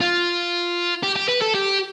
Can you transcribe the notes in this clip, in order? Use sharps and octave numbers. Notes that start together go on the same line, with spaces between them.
F4
G4
G4
B4
A4
G4